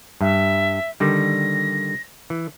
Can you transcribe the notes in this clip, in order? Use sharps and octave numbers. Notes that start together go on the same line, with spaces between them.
G2 E5
D3 D#3 G3 A#6
E3